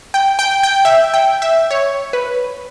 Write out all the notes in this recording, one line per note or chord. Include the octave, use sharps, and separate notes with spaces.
G5
G5
G5
E5
G5
E5
C#5
B4